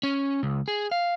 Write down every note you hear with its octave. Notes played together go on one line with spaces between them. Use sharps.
C#4
C#2
G#4
F5